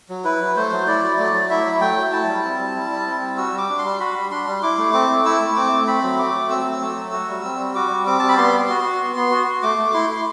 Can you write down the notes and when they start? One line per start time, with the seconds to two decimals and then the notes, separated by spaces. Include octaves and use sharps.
0.09 F#3
0.24 E4 B4
0.40 F#3
0.56 A3 C5
0.72 F#3
0.87 E4 D5
1.02 F#3
1.18 A3 D5
1.34 F#3
1.50 E4 E5
1.65 F#3
1.81 A3 G5
1.97 F#3
2.12 E4 A5
2.28 G3
2.44 C4
2.59 G3
2.75 E4
2.90 G3
3.06 C4
3.22 G3
3.37 F#4 E6
3.53 G3
3.58 D6
3.69 D4
3.78 C6
3.84 G3
4.00 F#4 B5
4.15 G3
4.31 D4 C6
4.47 G3
4.63 E4 D6
4.78 A3
4.93 C4 D6
5.09 A3
5.25 E4 E6
5.41 A3
5.56 C4 D6
5.72 A3
5.87 C4 B5
6.03 F#3
6.19 A3 D6
6.34 F#3
6.50 C4 E6
6.65 F#3
6.81 A3
6.97 F#3
7.12 F#4
7.28 G3
7.44 C4
7.59 G3
7.75 F#4 D6
7.91 G3
8.06 C4 D6
8.19 G3 A5
8.28 B5
8.38 B3 C6
8.53 B3
8.69 F#4
8.84 F#4
9.00 B3
9.16 B3
9.31 F#4
9.47 F#4
9.63 A3 D6
9.78 A3
9.94 E4 C6
10.10 E4